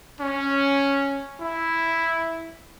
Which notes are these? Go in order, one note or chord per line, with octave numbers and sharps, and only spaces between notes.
C#4
E4